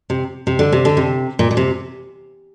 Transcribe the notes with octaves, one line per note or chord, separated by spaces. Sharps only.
C3
C3
D3
C3
D3
C3
A#2
A#2
C3